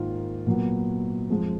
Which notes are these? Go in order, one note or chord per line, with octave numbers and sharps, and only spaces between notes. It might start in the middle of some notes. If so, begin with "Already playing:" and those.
Already playing: G#2 D#3 A#3 F4
A#2 F#3 B3
F2 F3 G#3